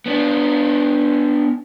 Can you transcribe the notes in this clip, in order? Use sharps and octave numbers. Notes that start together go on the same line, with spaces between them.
B3 D4